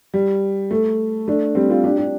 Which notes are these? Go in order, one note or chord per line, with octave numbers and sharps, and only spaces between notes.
G3
A3
A3 D4
G3 C4
C4 F4
D4 G4
D4 G4